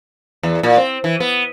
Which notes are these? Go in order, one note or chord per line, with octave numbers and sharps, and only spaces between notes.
E2
A#2
C4
E3
B3